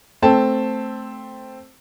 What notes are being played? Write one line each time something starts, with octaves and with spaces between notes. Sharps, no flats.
A3 C4 A5